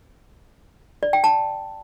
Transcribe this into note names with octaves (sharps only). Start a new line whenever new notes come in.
D5
G5
A5